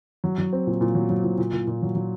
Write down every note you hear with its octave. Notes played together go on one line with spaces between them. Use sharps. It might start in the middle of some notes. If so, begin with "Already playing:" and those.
F#3
F#3
C4
A#2
A#2
F#3
F#3
A#2
A#2
A#2
A#2
F#3
F#3